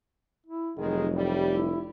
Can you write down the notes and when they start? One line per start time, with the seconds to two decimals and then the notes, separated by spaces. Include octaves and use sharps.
0.47 E4
0.77 F1 D#3 F#3 G#3 G#4
1.14 A2 G3
1.52 E4